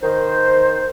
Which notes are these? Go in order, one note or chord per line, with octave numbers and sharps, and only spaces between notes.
D#3 C5